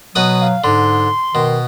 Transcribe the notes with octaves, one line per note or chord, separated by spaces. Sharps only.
B2 F#3 B4 D#6
F5
G#2 D3 C6
B2 D#3